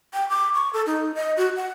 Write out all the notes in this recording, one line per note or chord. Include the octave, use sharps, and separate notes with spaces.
G5
D6
C#6
A4
D#4
D#5
F#4
F#5